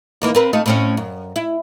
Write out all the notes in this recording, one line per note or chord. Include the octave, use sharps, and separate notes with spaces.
D#2 E3 A#3
C4 A#4 B4
A3 D#4 F4
A2 C4 C#4
F#2
E4